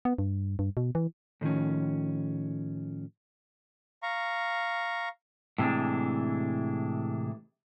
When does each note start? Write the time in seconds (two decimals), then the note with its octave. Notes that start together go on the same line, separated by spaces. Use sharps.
0.05 B3
0.18 G2
0.59 G2
0.77 B2
0.95 E3
1.41 A2 D#3 F3 C#4
4.03 F5 A#5 C#6
5.58 A2 C3 E3 G#3 D4